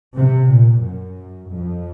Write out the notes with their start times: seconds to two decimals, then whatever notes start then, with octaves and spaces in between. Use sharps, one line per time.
0.15 C3
0.49 A#2
0.82 F#2
1.50 F2